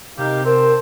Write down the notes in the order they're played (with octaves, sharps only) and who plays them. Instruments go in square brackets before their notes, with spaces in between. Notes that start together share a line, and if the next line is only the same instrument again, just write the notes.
[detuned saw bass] C3 [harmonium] D#4 A#4 F5 [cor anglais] G4
[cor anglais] C4 [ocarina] A#4 [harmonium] C5 A5